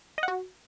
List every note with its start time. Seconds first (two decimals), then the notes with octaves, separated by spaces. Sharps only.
0.18 D#5
0.23 F#5
0.28 F#4